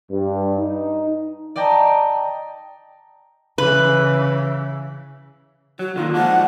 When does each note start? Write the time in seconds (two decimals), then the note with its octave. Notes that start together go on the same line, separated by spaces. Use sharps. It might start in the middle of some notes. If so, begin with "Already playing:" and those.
0.11 G2
0.59 D#4
1.56 D5 D#5 G5 A5 A#5
3.58 C#3 E3 B4
5.79 F#3 F#4
5.96 D3 D#3 A#3 F4
6.14 F3 G#3 D4 F#5